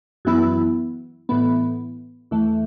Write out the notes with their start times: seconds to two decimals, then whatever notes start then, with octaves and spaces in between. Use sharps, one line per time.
0.25 F#2 E3 B3 E4
1.29 A2 E3 B3
2.31 E2 E3 A3